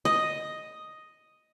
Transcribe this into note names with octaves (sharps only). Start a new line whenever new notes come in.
D#5